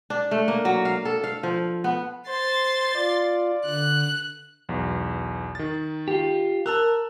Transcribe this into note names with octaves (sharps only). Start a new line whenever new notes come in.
D4
A3
A#3
F#3
F5
A4
F5
F3
B3
C5 C6 A6
F4 D5
D3 F#6
B1 E2
D#3 A6
F4 G4
A#4 A5 E6 F#6